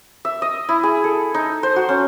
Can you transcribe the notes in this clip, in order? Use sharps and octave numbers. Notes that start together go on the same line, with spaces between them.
E5
D#5
E4
G#4
A4
D#4
C5
F#4
C#4